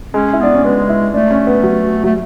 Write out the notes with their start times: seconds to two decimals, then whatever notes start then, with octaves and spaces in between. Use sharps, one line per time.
0.14 G#3 C#4
0.33 E4
0.40 B3 D4
0.54 C#4
0.64 G#3 B3
0.89 E4
1.14 A3 D4
1.31 C#4
1.47 B3
1.63 F#3
2.04 F#3 A3